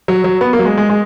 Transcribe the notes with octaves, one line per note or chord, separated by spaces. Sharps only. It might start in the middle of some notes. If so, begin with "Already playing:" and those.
F#3
F#3
B3
A#3
F#3
G#3
G#3
G#3